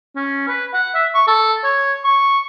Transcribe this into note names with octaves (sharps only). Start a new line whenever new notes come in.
C#4
B4
F#5
E5
C#6
A4
C#5
C#6